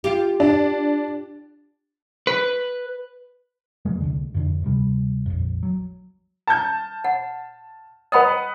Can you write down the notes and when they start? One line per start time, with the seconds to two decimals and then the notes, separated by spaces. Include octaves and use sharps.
0.04 F4 G4
0.40 D4
2.27 B4
3.85 E2 F#3 G#3 A#3
4.01 C2 D3
4.34 F2 D3
4.62 D2 C3 G3
5.26 A#1 F2
5.63 F#3
6.47 A5 G6
7.04 F#5
8.12 B4 D#5 F#5 G5 B5 D#6